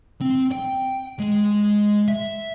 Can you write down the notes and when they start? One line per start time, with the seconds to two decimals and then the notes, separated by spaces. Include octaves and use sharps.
0.21 C4
0.52 G5
1.19 G#3
2.08 E5